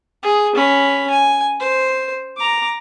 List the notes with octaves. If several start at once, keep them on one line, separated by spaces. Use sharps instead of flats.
G#4
C#4 B5
G#5
C5
A#5 D6